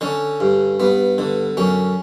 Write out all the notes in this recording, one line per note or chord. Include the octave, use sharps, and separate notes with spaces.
D3 C#4
G2
G2 B3
D3
F#2 C#4